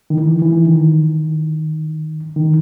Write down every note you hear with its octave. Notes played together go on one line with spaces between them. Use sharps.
D#3
E3
E3
D#3
D#3